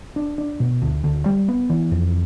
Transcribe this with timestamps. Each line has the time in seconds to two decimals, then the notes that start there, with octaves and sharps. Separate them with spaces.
0.16 D4
0.38 D4
0.60 B2
0.82 D2
1.04 D2
1.26 G3
1.48 B3
1.70 E3
1.91 F2